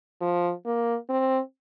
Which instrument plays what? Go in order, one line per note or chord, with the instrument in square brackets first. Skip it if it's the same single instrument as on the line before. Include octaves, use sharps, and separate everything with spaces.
[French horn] F3
A#3
C4